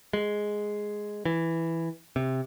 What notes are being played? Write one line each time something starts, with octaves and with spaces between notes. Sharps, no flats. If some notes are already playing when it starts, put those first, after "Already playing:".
G#3
E3
C3